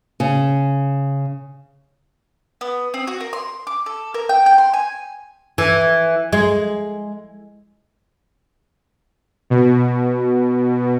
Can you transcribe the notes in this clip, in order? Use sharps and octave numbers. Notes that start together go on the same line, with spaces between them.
C#3
B3
C4
F#4
A#4
C6
D6
A4
A#4
G5
G5
C6
G#5
E3
G#3
B2